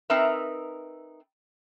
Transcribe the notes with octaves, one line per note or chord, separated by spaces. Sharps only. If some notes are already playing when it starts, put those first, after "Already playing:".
C4 D#4 A#4 B4 E5